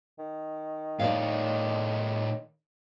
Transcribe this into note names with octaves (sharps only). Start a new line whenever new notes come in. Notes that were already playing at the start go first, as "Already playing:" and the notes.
D#3
A2 D#4 D5 F5